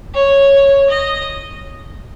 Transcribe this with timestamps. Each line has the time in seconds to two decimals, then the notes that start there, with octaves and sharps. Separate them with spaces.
0.14 C#5
0.90 D#5